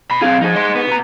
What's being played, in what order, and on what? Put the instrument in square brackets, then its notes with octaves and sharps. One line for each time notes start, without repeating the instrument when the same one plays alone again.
[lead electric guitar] B2 B5
[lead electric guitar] B1 F5 [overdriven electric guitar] C4 G#4
[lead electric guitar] F3 [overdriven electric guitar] D#4 G#4
[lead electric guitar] D#5 C6
B3
[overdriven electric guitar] B2 A#5